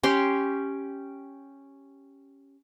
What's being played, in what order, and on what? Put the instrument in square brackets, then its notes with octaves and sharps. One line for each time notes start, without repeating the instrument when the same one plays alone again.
[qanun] C#4 G4 C6